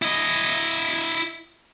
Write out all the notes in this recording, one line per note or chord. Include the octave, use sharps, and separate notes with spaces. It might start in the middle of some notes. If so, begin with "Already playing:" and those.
E4 D#5